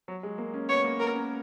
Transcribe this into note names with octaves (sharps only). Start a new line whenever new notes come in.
F#3
G#3
A#3
C#4
B3 C#5
A#3
B3 A#4
C#4